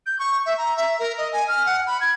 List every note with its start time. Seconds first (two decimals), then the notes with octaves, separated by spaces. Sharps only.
0.06 G6
0.19 C#6
0.46 E5
0.58 A#5
0.77 E5
0.99 A#4
1.18 D#5
1.33 G#5
1.48 F6
1.66 F#5
1.87 B5
2.01 G#6